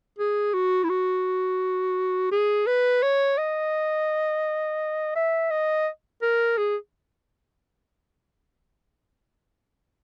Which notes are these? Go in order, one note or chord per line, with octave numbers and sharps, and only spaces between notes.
G#4
F#4
E4
F#4
G#4
B4
C#5
D#5
E5
D#5
A#4
G#4